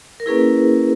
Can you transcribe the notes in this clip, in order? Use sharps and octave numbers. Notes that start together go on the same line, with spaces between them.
A#4
A#3 C#4 E4 G#4 B4